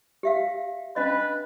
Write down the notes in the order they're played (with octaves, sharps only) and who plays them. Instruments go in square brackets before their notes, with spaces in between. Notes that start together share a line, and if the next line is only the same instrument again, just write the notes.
[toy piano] G4 E5 F5
[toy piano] C#4 D4 D#5 [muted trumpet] B4